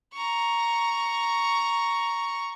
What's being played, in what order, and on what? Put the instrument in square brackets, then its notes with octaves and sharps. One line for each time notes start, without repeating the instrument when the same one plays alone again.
[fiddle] A#5 C#6